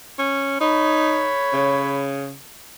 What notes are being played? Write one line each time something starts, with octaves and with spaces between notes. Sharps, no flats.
C#4
D#4 C#5 B5
C#3